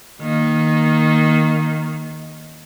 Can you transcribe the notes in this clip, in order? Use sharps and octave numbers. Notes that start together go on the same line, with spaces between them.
D#3 A#3